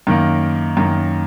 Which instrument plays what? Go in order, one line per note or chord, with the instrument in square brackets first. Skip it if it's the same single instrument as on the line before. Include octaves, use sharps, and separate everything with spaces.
[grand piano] F#2 D#3 A#3
F#2 D#3 A#3